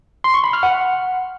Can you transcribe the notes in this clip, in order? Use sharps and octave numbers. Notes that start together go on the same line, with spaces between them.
C6
C#6
B5
F6
F#5